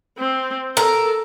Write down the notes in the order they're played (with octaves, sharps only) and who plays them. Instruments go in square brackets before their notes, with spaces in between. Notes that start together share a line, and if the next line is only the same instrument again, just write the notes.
[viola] C4
[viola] A4 [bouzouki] A#4